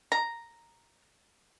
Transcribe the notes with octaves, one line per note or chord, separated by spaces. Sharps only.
A#5